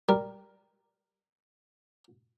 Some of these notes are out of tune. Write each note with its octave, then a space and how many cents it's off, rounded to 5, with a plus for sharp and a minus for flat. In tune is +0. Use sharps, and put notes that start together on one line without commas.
G3 +0 A#4 +0